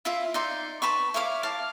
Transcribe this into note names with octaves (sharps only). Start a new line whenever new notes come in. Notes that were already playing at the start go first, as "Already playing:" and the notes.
E4 F4 E5
D#4 D5 C6
B4 A5 B5 C#6
E4 C#5 F5 D6
F5 A5 D6